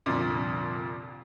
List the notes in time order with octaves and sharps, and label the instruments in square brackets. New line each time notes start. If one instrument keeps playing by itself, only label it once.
[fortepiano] C2 F2 A#2 D3